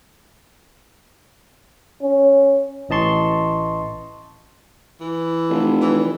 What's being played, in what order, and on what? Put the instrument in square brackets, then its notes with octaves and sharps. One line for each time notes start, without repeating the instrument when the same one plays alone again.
[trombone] C#4
[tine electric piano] A1 E3 D#5 A5 C6 C#6
[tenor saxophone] E3
[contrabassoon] F1
[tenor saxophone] E3